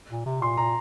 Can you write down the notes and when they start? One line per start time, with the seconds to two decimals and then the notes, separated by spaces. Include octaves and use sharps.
0.10 A#2
0.26 C3
0.41 A#2 C6
0.57 A#2 A#5